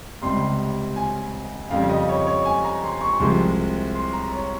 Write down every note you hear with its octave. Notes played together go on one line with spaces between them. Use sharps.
C#2 C3 G3 C6
G#5
F2 C#3 G3 F5
D#5
C#5
C#5
G#5
A#5
C6
C#6
C2 C3 F3 G#3 C6
C6
A#5
C#5